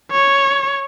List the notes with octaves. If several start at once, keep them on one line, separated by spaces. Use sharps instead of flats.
C#5